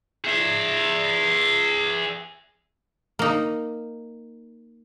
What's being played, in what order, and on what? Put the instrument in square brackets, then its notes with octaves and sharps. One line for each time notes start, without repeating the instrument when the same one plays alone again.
[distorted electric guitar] G#4 E5
[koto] A#3 D#4